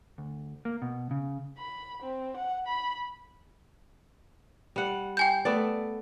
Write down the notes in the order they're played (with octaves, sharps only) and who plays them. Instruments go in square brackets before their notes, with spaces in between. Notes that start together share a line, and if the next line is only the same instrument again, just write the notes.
[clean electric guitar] D2
A#3
B2
C#3
[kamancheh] B5
C4
F#5
B5
[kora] G3 F#5
[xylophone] G5 G#5 G6
[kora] A3 B3 D5